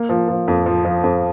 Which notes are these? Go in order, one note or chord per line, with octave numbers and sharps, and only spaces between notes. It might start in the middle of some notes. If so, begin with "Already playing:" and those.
Already playing: A#3
F3
F3
F2
F3
F3
F2